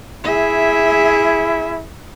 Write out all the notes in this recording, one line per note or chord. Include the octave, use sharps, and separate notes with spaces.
E4 G#4 E5